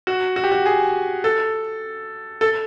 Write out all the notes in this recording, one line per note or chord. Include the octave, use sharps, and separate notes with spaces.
F#4
F#4
G4
F#4
G#4
A4
A4